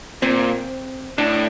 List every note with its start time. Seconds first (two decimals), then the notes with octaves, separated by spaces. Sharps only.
0.22 A#2 C4
1.18 A2 D4